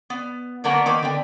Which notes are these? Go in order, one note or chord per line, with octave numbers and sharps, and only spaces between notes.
B3
D3 F#3 A#3 B3 A#4 F#5
D#3 A#3 B3
D3 B3 G5